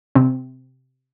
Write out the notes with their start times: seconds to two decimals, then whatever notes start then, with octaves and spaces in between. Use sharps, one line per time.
0.15 C3 C4